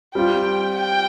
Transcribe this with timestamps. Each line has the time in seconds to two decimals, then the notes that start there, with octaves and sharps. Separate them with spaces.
0.14 G3 C4 F4 G5
0.76 G5